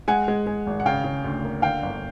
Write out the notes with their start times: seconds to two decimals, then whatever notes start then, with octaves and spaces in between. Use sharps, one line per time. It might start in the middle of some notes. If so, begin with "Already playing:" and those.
0.08 G#3 F#5 G#5
0.28 G#3
0.47 G#3
0.67 G#1
0.80 F#5
0.86 C#3 F5 G5
1.04 C#3
1.24 D2
1.44 A#3
1.62 D3 F5 G5
1.83 G1